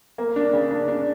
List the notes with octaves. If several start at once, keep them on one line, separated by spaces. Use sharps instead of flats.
A#3
D4
C#3
D4
D4